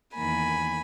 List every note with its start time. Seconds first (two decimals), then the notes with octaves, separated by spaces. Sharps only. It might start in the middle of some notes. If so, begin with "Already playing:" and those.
0.17 E2 D#3 A#3 G#5 B5